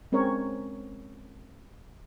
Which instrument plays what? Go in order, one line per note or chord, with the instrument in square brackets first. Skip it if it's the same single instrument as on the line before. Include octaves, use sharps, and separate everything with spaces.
[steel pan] G#3 C4 C#4 A#4 C#5